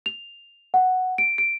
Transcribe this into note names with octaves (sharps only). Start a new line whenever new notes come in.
F7
F#5
D7
D7